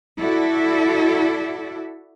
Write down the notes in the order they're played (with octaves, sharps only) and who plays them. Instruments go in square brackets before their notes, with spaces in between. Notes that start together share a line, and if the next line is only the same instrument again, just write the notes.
[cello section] E4 F#4 A4 D5 E5